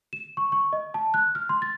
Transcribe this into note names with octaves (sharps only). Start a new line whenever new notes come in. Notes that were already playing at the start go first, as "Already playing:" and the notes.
E7
C#6
C#6
D#5
A5
F#6
F6
C6
A6